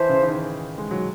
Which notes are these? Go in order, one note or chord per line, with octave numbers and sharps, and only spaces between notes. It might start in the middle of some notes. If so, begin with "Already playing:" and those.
Already playing: E3 C5 E5 A5
C#3
E3
D#3
G#3
F#3